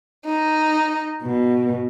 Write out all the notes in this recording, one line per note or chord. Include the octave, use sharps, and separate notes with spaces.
D#4
B2